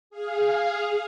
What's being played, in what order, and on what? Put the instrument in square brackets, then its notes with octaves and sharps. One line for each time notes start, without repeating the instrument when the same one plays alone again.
[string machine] G#4 F5